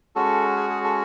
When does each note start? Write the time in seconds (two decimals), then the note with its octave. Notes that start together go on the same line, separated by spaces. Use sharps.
0.16 G#3 C#4 F#4 A4
0.56 G#4
0.70 G#4
0.84 A4